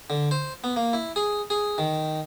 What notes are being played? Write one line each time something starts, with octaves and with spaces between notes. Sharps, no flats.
D3
C5
B3
A#3
E4
G#4
G#4
D#3